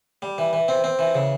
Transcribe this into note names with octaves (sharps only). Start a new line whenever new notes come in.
G3
E3
E3
C4
C4
E3
C#3